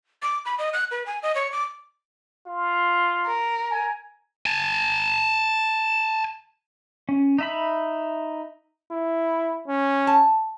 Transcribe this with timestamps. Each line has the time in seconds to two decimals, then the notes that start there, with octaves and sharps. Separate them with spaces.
0.22 D6
0.45 B5
0.58 D#5
0.73 F#6
0.91 B4
1.06 G#5
1.23 D#5
1.35 C#5
1.52 D6
2.47 F4
3.27 A#4
3.71 G#5
4.46 G#5 A5
7.09 C#4
7.39 D#4 E5 B5
8.91 E4
9.68 C#4
10.07 A5